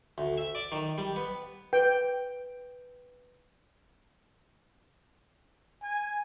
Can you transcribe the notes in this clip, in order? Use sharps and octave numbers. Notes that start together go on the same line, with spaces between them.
D2
E5
D5
D#3
G3
B3
B4 G5
G#5